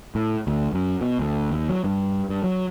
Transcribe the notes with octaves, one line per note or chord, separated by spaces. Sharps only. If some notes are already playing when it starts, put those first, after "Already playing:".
A2
D2
F#2
B2
D2
D#2
F#3
G2
G2
F#3